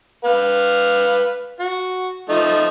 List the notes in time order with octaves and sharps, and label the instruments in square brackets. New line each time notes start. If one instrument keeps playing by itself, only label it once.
[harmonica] B4 F5
F#4
F3 A3 D#4